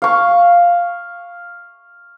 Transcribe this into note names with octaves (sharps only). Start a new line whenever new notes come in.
F5 C#6